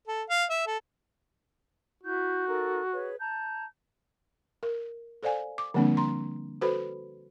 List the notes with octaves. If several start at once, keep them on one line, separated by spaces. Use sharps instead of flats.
A4
F5
E5
A4
E4 F#4 G6
D#4 A4 A#4
G#4 B4 C#5
A5 A#5 G6
A#4
A4 C5 D5 F5 G#5
D6
D3 F3 G3 A#3 C4 D4
A#5 C6
F#4 A4 B4 C5 B5